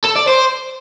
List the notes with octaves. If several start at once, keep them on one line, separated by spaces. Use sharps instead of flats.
A4
D5
C5